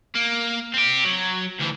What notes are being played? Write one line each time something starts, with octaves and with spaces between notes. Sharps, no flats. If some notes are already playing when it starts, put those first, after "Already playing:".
A#3
C4 G4
F#3
D2 E3